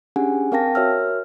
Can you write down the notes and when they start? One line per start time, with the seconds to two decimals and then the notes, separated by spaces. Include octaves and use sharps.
0.16 C#4 D4 G4 G#4 F#5 G#5
0.52 C4 A#4 F5 G5 A5 A#6
0.75 F#4 A#4 C#5 E5 E6 F6